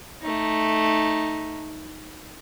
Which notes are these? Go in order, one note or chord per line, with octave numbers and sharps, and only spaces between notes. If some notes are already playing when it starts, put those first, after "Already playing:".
A3 D#4